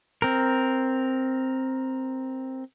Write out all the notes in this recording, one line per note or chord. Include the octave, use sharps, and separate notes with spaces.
C4 A#4